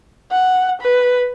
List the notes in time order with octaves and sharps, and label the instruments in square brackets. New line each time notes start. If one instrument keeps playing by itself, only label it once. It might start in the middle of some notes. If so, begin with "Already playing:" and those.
[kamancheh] F#5
B4